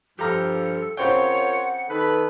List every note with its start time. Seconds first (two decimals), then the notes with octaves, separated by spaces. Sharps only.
0.19 G2 F3 G4 A4 A#5 F6
0.97 C#3 C4 F4 A#4 C#5 F#5 G5
1.89 D#3 A4 B4